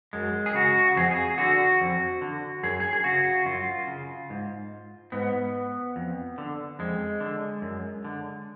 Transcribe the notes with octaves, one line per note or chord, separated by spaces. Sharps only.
F#2 G#3
G#4
C#3 F#4
F2 G#4
G#4
D3 F#4
F2
D3
F#2 G#4
G#4
G#4
C#3 F#4
F#2 F4
C#3
G#2
G#2 B3
F2
D3
F2 G#3
D3
F#2
D3